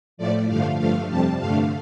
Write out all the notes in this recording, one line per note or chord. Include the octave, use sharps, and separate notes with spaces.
A2 F3 A3 D5
G2 D3 F3 A3 F5
G2 F3 A3 F5
F2 C3 G3 A5
G2 D3 A3 F5